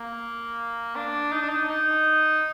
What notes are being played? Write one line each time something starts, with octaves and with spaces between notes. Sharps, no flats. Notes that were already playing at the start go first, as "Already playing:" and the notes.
Already playing: A#3
D4
D#4
D4
D#4
D#4